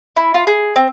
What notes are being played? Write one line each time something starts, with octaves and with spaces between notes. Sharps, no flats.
E4
F4
G#4
C4